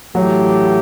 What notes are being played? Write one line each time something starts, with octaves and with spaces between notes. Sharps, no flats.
A2 E3 F#3 A3 E4 G4